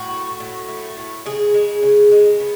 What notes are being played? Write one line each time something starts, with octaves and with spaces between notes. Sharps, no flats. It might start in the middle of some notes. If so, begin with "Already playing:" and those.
Already playing: A2 F#4
A3
A2
A3
A2
C#3 G#4
G#3
C#3
G#3
B3